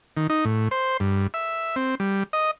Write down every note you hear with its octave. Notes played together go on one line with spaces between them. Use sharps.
D#3
D#4
A2
C5
G2
E5
C4
G3
D#5